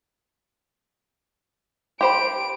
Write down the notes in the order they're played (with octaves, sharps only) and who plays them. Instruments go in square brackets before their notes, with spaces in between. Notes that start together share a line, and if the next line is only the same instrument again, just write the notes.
[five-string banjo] G4 C5 B5 [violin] D7